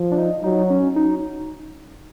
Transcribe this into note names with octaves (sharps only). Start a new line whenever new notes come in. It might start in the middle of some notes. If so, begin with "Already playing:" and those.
Already playing: F3
D4
D#4
F#3 D#4
C#4
D#4